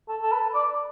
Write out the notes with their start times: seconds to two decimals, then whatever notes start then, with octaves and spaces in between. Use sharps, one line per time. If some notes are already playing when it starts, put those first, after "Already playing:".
0.08 A4
0.22 A4
0.32 B4
0.54 D5